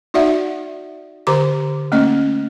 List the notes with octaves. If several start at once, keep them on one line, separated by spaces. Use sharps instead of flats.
D#4 F#4 D5 E5 F#5
D3 G4 C5 A#5 D6
A3 A#3 C#4 D#5